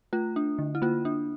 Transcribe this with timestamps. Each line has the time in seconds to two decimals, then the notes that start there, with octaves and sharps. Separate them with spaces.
0.13 A3 F4
0.36 D4
0.59 D3
0.75 E4
0.82 A#3 F4
1.05 D4